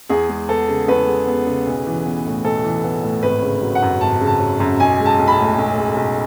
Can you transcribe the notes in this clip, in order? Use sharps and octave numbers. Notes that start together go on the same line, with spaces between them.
E2 G#4
G#3
B3 A4
C#3
E2 B4
G#3
B3
C#3
B1
E3
B3
A2
B1 A4
E3
B3
A2
G#1 B4
C#3
F#3
F#5
F#2
G#1 A5
C#3
A5
F#3
F#2
B1 G#5
G#3
A5
B1
B5
A5
A2
B1
G#3
B1